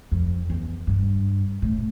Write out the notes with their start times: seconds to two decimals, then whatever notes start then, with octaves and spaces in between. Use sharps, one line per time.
0.11 F2
0.50 E2
0.87 G2
1.62 A2